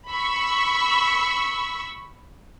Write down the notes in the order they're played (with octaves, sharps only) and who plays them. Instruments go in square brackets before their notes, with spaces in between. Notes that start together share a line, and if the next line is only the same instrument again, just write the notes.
[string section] B5 C#6 E6